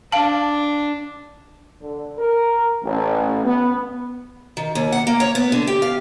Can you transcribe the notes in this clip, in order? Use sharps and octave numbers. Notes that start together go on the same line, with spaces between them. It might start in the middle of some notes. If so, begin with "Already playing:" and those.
D4 F5 A5
D3
A#4
A1
B3
D#3
D#2
F#5
A#3
C#5
B3
D3
G4
F5